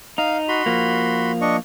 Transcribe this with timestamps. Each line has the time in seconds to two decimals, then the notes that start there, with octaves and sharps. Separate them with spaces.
0.18 D#4 F5
0.48 F#4 B5 C6
0.66 F3 A#3
1.41 D4 D#5 C#6